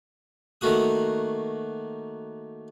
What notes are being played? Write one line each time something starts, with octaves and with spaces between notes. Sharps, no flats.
D#3 A3 A#3 F#4 D#6